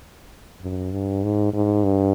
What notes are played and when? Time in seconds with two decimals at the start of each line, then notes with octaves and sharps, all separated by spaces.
0.62 F#2
0.92 G2
1.24 G#2
1.53 G#2
1.84 G2